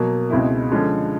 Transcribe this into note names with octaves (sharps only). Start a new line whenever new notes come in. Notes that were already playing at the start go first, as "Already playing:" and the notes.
Already playing: B2 F#3 A#3
C#2 B2 G#3 C4 E4
D3 F3 G#3 C#4